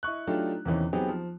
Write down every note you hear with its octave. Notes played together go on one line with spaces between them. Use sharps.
E4 D#5 C#6 F#6
F#3 A3 D4 D#4 F4 G4
E2 C3 D#3 E3 C#4
F#3 B3 C4 D#4 G4 G#4
F3